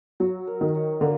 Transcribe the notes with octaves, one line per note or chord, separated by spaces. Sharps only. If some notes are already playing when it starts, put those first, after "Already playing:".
F#3 F#4
A#4
D#3
F#3
D3 A#3